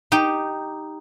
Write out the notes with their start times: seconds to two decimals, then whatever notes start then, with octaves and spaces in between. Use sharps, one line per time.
0.12 D#4 G4 G5